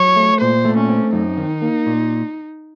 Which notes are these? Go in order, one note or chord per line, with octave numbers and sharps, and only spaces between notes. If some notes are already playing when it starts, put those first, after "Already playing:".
Already playing: F#3 C#5
A3
A#2 C5
A3
C#4
C4
F#2 D#4
D#3
A#3
A#2